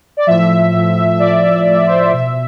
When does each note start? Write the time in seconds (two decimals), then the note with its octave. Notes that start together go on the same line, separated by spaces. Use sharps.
0.17 D5
0.27 A2 F3 E5
0.73 A2 F3
1.19 A2 F3 D5
1.65 A2 F3
1.87 C5
2.00 D5
2.12 B2 E5